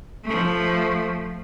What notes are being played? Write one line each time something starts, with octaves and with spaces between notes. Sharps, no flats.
F3 A3